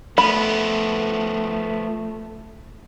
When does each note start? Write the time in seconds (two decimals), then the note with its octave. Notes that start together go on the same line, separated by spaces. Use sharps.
0.18 F3 A3 B3 B5